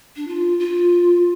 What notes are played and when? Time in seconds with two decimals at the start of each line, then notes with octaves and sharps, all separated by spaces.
0.16 D4
0.28 F4
0.59 F4